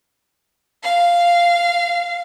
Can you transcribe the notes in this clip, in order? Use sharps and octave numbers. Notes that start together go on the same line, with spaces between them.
F5